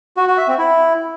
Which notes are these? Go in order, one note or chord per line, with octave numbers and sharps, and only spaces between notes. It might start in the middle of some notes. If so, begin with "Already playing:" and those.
F#4
F#4
E5
C4
E4